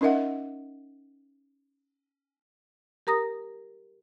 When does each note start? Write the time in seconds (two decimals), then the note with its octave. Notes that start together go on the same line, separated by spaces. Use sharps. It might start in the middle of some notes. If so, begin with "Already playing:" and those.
0.01 C#4 D#4 A#4 D#5 E5 F#5
3.07 G4 A#4 A#5 D#6 A#6